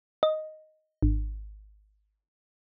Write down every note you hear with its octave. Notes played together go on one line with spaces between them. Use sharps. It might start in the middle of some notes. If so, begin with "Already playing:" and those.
D#5
G#1